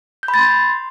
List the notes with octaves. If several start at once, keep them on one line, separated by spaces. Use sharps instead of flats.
G6
B5
A6
C6